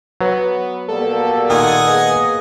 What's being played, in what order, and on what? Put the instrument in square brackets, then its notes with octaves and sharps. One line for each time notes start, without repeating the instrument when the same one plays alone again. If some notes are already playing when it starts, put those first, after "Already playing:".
[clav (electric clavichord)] F#3 [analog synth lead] B3
[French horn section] B2 G3 A#3 [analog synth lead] A4
[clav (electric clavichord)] A#2 D#3 [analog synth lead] A4 [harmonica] F#5 G#5 D#6
[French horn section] A#3 B3 G#4 [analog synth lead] D#5